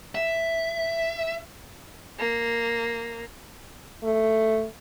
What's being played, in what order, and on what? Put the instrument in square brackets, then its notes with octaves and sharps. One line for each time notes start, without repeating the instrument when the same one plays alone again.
[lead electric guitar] E5
[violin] A#3
[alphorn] A3